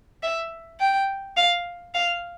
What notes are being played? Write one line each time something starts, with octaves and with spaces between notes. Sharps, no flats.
E5
G5
F5
F5